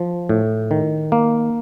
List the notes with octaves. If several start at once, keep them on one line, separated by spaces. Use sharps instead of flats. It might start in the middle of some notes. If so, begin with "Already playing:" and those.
Already playing: F3
A2
D#3
A#3